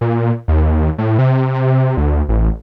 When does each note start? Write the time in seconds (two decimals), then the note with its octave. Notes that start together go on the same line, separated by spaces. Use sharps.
0.01 A#2
0.48 D#2
0.98 A2
1.18 C3
1.54 C3
1.97 D2
2.29 A1